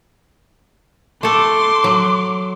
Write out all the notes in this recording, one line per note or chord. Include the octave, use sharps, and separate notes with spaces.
A3 A4 C6 D6
F#3